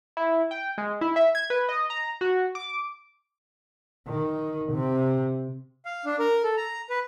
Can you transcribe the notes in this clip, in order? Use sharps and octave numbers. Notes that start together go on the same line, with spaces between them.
E4
G5
G#3
E4
E5
G#6
B4
D#5
A#5
F#4
D6
D#3
C3
F5
D4
A#4
A4
A#5
B4